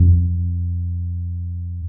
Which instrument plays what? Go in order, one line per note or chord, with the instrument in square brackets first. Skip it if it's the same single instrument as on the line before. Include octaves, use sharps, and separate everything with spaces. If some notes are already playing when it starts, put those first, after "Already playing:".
Already playing: [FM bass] F2